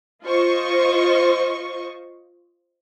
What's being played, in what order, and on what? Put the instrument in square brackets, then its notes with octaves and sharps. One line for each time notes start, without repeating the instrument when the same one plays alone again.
[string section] F4 C5 D#5 C#6